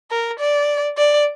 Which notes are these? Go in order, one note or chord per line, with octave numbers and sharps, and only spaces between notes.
A#4
D5
D5